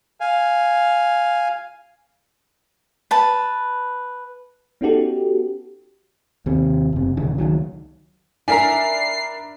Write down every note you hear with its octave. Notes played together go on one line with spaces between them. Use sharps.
F5 G#5
B4 A5
B3 C#4 D#4 F#4 G4 A4
D#2 C3
F#1 C3
D#1 C#3 E3
C#2 D#3 F#3
D4 E4 A#4 G#5 A#5 C7